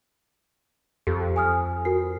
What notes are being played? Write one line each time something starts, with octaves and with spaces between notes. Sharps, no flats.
F2 G4 A4
G#5 D#6 F6
F#4 A#4 C7